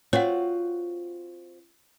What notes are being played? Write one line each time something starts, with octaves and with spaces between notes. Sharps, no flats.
C4 F4 F#4 C#5 F#5